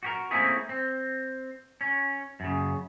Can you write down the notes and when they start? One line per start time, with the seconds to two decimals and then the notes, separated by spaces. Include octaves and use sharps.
0.03 F#4 G4 A#4
0.31 A3 A#3 C4 C#4 E4 G#4
0.69 C4
1.81 C#4
2.40 F#2 C#3